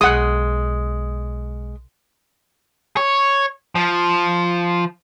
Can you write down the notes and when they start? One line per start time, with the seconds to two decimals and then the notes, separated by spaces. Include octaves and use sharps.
0.01 B1 G#3 F#5 D#6
2.97 C#5
3.75 F3